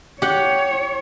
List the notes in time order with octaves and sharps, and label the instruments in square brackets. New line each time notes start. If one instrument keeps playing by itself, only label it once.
[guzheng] G4 F#5 [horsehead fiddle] C#5